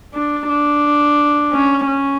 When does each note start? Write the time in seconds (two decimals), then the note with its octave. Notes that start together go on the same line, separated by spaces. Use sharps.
0.14 D4
0.49 D4
1.52 C#4
1.87 C#4